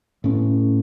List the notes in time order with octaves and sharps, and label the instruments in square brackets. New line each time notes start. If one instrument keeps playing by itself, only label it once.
[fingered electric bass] A2 C#4